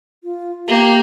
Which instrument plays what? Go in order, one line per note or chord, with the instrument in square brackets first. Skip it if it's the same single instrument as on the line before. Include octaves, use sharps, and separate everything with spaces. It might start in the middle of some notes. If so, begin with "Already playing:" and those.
[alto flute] F4
[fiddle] A#3 [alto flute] G4